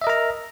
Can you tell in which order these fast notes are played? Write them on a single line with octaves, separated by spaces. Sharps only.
E5 D#5 A#4 A#5